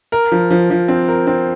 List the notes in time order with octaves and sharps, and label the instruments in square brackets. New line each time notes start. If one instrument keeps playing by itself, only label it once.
[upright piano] A#4
F3
F3
F3
C4
A#4
C4